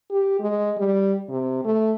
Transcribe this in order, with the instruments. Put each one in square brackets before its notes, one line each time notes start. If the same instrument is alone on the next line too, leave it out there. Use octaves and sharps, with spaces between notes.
[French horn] G4
G#3
G3
C3
A3